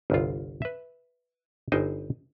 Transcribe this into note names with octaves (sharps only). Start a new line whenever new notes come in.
G1 C2 F4
B4 E5
G1 D#4 C5 G5 G#5